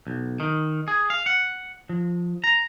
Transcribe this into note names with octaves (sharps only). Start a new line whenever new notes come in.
B1
D#3
G#4
F5
F#5
F3
A#5